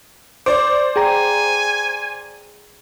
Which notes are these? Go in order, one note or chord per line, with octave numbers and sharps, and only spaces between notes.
C5 D5 D6
G#4 G5 G#5 A#5